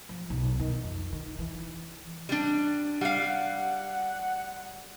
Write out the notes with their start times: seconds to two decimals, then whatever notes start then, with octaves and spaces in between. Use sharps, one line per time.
0.09 F3
0.30 B1
0.60 D#3
0.84 F2
1.13 D#3
1.39 E3
2.29 G3 D4
3.01 G3 F5 F#5